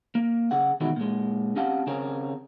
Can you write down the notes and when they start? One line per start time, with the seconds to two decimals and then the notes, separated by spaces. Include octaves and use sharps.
0.15 A#3
0.51 C#3 G#4 F#5
0.81 B2 D#3 E3 G#3 E4 F#4
0.96 A#2 G#3
1.56 C4 C#4 G4 F5 F#5 A5
1.87 C#3 C4 C#4 G#4 A#4